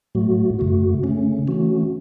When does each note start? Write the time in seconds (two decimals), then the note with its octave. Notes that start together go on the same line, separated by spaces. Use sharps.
0.15 A2 F#3 A3 F#4
0.59 F#2 C#3 A3 F#4
1.03 C#3 A3 C#4
1.48 E3 A3 C#4 F#4